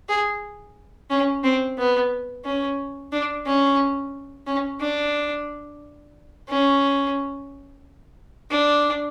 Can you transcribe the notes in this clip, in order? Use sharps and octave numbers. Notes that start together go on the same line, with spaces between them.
G#4
C#4
C4
B3
C#4
D4
C#4
C#4
D4
C#4
D4